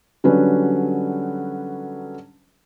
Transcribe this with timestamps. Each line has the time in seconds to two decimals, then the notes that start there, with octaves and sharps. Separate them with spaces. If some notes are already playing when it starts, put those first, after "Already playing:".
0.24 D3 F#3 G3 C#4 B4